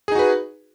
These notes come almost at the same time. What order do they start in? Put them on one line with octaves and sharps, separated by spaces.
G#4 D#4 F#4 B4